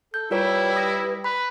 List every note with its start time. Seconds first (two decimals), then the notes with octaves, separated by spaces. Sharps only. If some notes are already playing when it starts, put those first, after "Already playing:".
0.14 A4 G6
0.31 G3 E4 F4 A#4 B4 C#5
0.76 D#6 A#6
1.24 B4 B5